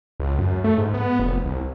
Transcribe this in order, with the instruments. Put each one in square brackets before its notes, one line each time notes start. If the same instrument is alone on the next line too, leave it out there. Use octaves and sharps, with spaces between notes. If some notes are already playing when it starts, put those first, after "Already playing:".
[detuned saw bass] C#2
F#2
A3
G#2
B3
F1
C2